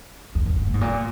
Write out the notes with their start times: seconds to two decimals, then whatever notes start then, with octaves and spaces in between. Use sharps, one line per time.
0.35 E2
0.46 F#2
0.56 G#2
0.66 A#2
0.74 G#2
0.81 A#2